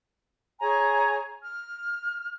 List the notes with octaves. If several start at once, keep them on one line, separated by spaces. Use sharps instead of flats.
G#4 C#5 G#5 A#5
F6